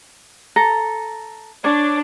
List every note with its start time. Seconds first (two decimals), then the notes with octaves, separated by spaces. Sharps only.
0.56 A4 A#5
1.64 D4 C#5 D5